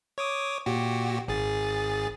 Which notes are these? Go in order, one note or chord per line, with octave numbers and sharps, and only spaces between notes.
C#5 D6 D#6
A#2 F#4 G4
G#1 G#4 A6